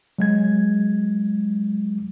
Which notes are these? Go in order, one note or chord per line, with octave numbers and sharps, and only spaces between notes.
F#3 G#3 G#6